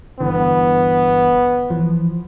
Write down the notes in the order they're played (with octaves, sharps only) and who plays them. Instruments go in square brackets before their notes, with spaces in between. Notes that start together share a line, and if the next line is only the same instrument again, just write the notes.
[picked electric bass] G1 D3 E3 [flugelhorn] B3
[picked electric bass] E3 F3